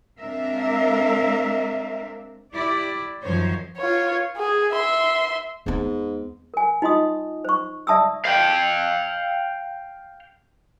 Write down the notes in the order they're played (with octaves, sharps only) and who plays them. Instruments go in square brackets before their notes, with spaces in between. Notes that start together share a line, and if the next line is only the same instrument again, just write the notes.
[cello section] G#3 C4 D4 A#4 E5 F5
E4 G4 D5
F#2 D#3 F3 C5 C#5
[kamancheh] F4 C#5
G#4
E5 C6
[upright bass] E2 B3 [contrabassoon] G#2
[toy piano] A#4 G#5
D#4 F4 D#5 C6 D#6
C5 C#6
D5 E5 A5 D#6 E6
[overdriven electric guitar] F5 G5